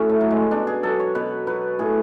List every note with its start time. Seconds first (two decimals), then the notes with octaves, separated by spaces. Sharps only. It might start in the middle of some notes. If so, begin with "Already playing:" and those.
Already playing: A2 C#4 F#4
0.09 A3
0.21 F#3
0.30 G#3
0.51 B2 D4
0.67 G#4
0.83 F#3 A4
1.00 C#5
1.15 B2 B4
1.47 F#3 B4
1.79 A2 G#4